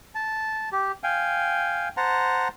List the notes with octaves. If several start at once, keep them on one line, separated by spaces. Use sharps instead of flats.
A5
G4
F5 G5 G#5
C5 F#5 A5 A#5